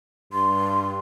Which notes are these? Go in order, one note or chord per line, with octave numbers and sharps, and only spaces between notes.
G2 C6